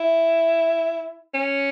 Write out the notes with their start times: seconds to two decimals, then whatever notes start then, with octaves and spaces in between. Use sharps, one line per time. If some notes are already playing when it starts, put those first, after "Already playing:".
Already playing: E4
1.34 C#4